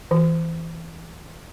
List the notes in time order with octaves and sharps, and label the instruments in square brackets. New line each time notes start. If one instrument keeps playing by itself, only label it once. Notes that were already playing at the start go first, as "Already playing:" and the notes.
[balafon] E3